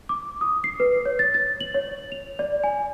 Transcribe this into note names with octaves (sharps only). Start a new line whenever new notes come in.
D6
D#6
C7
B4
C#5
A6
A6
F#7
C#5
F7
D5
G#5